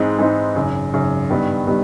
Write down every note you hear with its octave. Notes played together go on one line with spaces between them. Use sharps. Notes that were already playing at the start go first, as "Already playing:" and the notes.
Already playing: G#2 E3 G#3 C4 D#4
G#2 E3 G#3 C4 D#4
G#1 F#2 C#3
G#1 F#2 C#3
G2 D#3 G3 B3
D#3 G3 B3